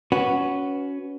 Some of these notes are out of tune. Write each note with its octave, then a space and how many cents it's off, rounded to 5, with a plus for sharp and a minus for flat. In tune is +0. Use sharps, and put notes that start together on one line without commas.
C#4 +15 F#4 +0 B4 +0